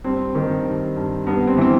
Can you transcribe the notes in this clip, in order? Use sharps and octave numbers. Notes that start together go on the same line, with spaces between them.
G2 C4
D#3
G2
G2
G2 B3
C4
E3 C4